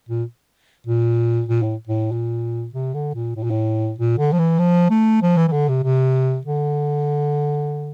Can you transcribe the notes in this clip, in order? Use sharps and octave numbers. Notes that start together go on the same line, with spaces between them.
A#2
A#2
A#2
A2
A2
A#2
C3
D3
A#2
A2
A#2
A2
A#2
D3
F3
E3
F3
A3
F3
E3
E3
D3
C3
C3
D3